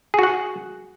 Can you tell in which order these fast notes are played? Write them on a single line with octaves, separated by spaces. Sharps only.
G#4 F#4 F#5